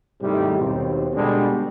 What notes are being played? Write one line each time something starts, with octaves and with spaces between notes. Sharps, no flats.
G#2 C3 D#3 G3 A3 E4
D#2 B2 C4
B2 D3 G3 G#3 D4